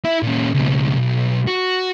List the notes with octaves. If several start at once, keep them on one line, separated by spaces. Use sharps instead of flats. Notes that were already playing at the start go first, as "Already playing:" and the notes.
E4 E5
A#2 C#4
C#2 B2
B1
F#4